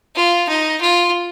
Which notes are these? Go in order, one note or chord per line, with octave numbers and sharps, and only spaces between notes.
F4
D#4
F4